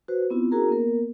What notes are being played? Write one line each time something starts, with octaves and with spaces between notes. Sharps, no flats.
F#4 B4 C5
B3 C4 E4 F4
C#4 E4 F#4 G#4 A#4 A#5
A#3 B3 A#4